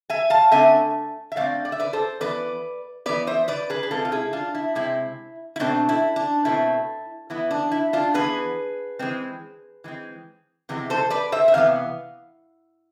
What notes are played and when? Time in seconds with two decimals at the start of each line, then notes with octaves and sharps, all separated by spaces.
0.10 E5 G#5
0.30 F5 A5
0.51 D3 A3 C4 E5 G#5
1.32 E5
1.36 D3 A3 C4 D5 F5
1.65 D5
1.72 E5
1.80 B4 D5
1.93 A4 C5
2.21 E3 B3 B4 D5
3.06 E3 B3 B4 D5
3.27 C5 E5
3.48 B4 D5
3.70 G#4 B4
3.83 G#4
3.91 C3 G#3 C4 F4 A4
4.05 F4
4.12 E4 G#4
4.33 D4 F4
4.55 E4
4.75 C3 G#3 C4 E4
5.56 E4
5.60 B2 A3 C4 D4
5.89 E4
6.16 D4
6.45 B2 A3 C4 E4
7.30 E3 B3 E4
7.51 D4
7.72 E4
7.93 D4 F4
8.14 E3 B3 G#4 B4
8.99 E3 G#3 C4
9.84 E3 G#3 C4
10.69 C3 E3 G#3 B3
10.90 A4 C5
11.10 B4 D5
11.32 C5 E5
11.48 E5
11.54 C3 E3 B3 F5